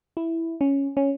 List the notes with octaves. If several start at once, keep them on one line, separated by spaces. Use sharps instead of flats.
E4
C#4
C#4